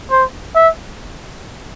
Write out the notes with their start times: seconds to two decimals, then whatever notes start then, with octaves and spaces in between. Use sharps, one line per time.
0.11 C5
0.55 E5